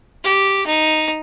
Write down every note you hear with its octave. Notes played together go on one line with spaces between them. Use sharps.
G4
D#4